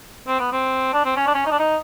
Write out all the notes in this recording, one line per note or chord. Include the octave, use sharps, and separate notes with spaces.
C4
B3
C4
D4
C4
C#4
D4
C#4
D#4
D4
D#4